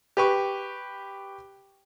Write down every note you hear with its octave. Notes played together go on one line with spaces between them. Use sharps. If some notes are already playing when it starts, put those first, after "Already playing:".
G4 B4 C#6